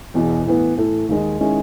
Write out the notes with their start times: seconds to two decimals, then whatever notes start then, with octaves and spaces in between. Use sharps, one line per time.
0.14 E1 E2 B2
0.46 A2 E3 B3
0.77 A2 E3 A3
1.09 D#2 D#3 G#3 D#4
1.40 D#3 G#3 C#4 E4